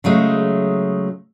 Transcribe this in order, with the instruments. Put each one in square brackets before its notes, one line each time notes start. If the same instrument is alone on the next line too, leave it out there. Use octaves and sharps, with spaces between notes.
[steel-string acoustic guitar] C#3 F#3 G#3 A3